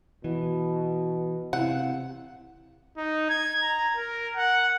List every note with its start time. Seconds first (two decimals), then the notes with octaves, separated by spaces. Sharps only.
0.24 B2 E3
1.53 C3 E4 F5 F#5
2.97 D#4
3.30 G#6
3.62 A#5
3.96 A#4
4.36 F#5